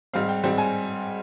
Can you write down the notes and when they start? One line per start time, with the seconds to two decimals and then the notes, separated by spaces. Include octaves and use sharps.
0.13 G#2 G3 C4 F5
0.29 G5
0.44 G#2 G3 C4 G5
0.58 G#5